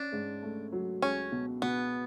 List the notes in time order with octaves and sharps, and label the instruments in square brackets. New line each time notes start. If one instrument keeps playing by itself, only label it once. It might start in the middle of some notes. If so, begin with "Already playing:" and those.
Already playing: [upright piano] C#4 [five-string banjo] D4
[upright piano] G#2
A3
F#3
[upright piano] C#2 [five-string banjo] C#4
[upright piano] B2
[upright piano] B2 [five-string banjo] B3